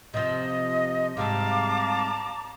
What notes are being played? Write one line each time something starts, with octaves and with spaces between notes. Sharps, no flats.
C3 F3 D#5
G#2 C3 G3 F5 A5 A#5 D6